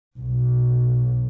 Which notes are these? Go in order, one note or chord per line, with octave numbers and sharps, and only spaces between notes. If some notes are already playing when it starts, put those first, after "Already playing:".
B1